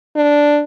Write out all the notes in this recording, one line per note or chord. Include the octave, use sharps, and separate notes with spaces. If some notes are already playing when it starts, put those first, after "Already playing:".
D4